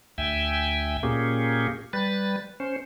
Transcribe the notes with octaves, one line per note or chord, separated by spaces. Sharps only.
D2 E5 G5 G#5
A#2 A#3 C#4 G4 G#4
G3 B4 A6
C#4 C5